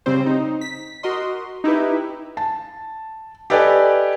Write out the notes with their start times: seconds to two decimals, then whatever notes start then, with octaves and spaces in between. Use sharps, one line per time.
0.06 C#3 G3 C4 C5
0.26 D#4
0.61 B6
1.03 F#4 A#4 D#5 C6
1.64 D#4 E4 G4 B4
2.37 A5
3.50 G4 A4 B4 D5 D#5 G#5